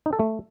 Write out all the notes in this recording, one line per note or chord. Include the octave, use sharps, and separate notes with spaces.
D#4
A4
A3